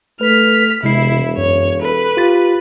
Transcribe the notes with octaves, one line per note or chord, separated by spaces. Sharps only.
A3 B4 F6 B6
E1 C3 G#3 E4 C7
F#2 C#5
A4 B4
F4 G4 A6